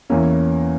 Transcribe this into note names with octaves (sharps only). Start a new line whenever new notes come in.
E2 E3 A#3 C#4